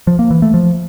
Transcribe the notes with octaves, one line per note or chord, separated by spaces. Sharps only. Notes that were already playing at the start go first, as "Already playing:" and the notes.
F3
A#3
E3
A3
F3